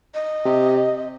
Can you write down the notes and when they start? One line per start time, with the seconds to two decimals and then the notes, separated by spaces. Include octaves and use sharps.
0.14 D#5
0.45 C3